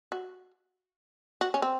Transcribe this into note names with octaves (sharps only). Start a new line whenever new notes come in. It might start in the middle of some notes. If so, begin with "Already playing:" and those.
F#4
F#4
C#4
C4